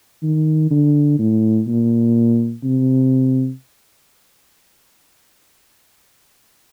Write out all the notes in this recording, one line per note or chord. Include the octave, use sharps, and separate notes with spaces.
D#3
D3
A2
A#2
C3